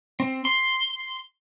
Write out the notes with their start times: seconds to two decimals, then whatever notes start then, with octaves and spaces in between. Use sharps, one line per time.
0.20 C4
0.45 C6